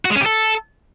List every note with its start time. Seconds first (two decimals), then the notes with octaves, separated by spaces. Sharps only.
0.05 F#4
0.10 G#3
0.16 C#4
0.21 G4
0.26 A4